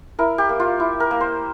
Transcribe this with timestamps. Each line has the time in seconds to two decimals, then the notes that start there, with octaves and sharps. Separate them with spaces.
0.19 E4 A#4
0.38 G4
0.49 A#3
0.60 F4
0.80 E4
1.00 A#4
1.11 A#3
1.20 C5